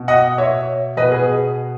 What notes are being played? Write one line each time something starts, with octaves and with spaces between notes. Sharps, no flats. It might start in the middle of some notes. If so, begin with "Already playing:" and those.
Already playing: B2
D#5 F#5
C#5 E5
B2 B4 D#5
G#4 B4